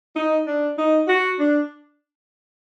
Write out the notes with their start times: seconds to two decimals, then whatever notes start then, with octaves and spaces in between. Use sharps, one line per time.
0.16 D#4
0.47 D4
0.77 D#4
1.08 F#4
1.39 D4